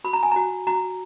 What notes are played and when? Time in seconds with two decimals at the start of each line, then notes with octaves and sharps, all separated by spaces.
0.04 F#4 B5
0.13 A#5
0.23 G#5
0.31 F#4 A#5
0.67 F#4 A#5